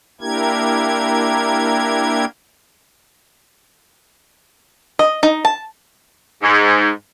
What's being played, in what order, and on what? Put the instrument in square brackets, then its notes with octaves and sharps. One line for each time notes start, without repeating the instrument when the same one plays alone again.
[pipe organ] A#3 D4 E4 G4 A#4 G#6
[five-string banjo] D#5
D#4
A5
[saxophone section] G#2